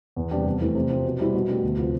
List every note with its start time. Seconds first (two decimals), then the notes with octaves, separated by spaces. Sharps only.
0.16 E2
0.31 C3 G3 D4 G4
0.46 F2
0.61 E3 A3
0.75 C3
0.90 F3 C4
1.05 B2
1.19 G3 C4 E4
1.35 B2
1.49 A3 D4 G4
1.63 D2
1.78 C3 F3 B3 F4